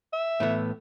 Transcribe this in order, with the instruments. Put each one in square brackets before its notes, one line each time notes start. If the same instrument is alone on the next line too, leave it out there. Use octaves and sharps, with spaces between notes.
[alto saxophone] E5
[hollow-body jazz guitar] A2 E3 B3